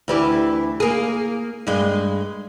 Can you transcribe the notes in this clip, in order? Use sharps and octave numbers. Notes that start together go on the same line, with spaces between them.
D2 E3 G4
A#3 G#4
G2 G#3